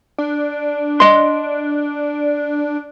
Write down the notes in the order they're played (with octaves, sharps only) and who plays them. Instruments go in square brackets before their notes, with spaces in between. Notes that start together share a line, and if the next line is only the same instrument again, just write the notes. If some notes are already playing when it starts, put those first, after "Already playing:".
[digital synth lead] D4
[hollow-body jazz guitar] D#5 C6